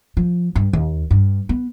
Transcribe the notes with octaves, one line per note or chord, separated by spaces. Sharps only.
F3
G2
D#2
G2
B3